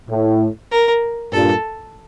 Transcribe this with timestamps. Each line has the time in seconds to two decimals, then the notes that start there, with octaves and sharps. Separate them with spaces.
0.09 A2
0.71 A#4
1.32 G2 A#2 A4